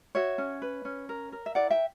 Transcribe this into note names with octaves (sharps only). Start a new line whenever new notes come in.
F#4 C#5 E5
C#4
B4
C#4
A#4
A#4
E5
E4 D5 F#5
E5 G5